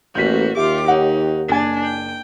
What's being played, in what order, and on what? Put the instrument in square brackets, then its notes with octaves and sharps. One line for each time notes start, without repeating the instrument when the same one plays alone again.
[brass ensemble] A1 [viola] A#3 F#4 [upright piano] G6 B6
[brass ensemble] D#2 G4 [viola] F4 D6 [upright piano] E5
[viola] D#4 [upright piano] C#5 F#5
[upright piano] F#1 G#5 [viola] D4
[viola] G5